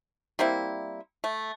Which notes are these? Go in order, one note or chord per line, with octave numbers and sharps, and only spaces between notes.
G3 A#3 C4 E4
A3